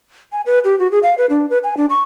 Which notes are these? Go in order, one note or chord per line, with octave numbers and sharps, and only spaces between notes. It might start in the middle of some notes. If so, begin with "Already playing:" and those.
G#5
B4
G4
F#4
G#4
F5
B4
D4
B4
G#5
D4
C#6